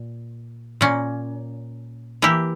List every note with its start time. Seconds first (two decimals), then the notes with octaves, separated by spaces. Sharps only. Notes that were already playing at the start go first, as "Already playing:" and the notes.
Already playing: A#2
0.81 A#2 A#3 C#4
2.22 E3 A#3 E4 G4